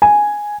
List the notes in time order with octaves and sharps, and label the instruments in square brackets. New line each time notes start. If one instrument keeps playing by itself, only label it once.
[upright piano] G#5